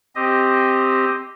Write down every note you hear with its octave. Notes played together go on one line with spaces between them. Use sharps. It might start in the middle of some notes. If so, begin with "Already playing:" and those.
C4 G4 D#5